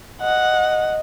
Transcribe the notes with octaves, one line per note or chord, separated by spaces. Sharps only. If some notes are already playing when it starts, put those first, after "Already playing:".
D#5 F#5